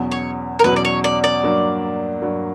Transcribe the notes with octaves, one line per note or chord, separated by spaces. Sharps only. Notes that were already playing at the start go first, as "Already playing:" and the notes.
Already playing: E2 B2 F#3 C#4
C#5
A#4
E2 B2 F#3 C#4 B4
D5
C#5
D5
D5
G2 F#3 A#3
G2 F#3 A#3